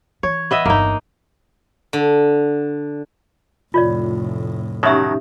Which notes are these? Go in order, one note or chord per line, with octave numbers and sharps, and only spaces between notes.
E3 C#5
B3 D#5 E5
G1 E2 A#3 D#4
D3
F1 A2 F4 C#5 D5
B2 D#3 F#3 C#4 D#4 G4 C#5 E5